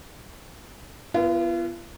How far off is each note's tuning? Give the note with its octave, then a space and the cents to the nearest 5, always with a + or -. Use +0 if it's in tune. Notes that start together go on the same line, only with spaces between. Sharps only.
B3 +0 F4 -40 A#4 +40